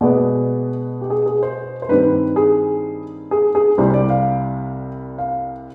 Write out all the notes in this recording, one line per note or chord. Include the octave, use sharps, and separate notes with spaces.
B2 G#3 B3 D5
G4
G#4
G#4
C5
C5
G2 D#3 G3 C4 B4
G#4
G#4
G#4
C2 C3 G3 C5
D5
F5
F5